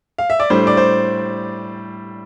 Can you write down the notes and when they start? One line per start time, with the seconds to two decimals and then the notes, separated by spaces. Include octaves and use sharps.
0.18 F5
0.30 E5
0.40 D5
0.50 A2 G3 D4 C5
0.67 D5
0.77 C5